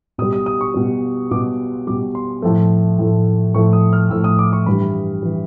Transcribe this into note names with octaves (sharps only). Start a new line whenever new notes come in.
B2 G3 D#6
D#6
D#6
C#6
B2 G3
B2 G3 D6
B2 G3 D6
C6
A2 F3 A3
A2 F3 A3
A2 F3 A3 C#6
D#6
F6
A2 F3 A3 E6
D#6
D6
C#6
G2 E3 G3 B5
E3 G3